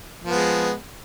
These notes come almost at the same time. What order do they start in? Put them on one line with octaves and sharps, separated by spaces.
F3 B3 G#3